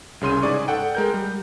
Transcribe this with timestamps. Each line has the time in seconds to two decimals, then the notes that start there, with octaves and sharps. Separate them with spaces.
0.21 C2 C#3 C6 D#7
0.42 G#2 G#4 D5 C#6
0.68 A4 F#5 G5
0.95 G#3 A#4 G6
1.14 G3